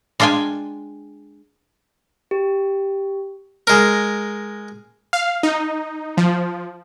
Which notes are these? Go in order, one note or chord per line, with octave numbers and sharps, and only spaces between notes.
G#3 D4 F4 G5 G#5
G4
G#3 A#4
F5
D#4
F3